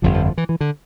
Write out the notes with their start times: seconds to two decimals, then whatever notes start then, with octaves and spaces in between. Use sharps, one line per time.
0.02 G1 F2 D3 F3
0.14 F3
0.27 F3
0.38 E3
0.49 E3
0.61 D3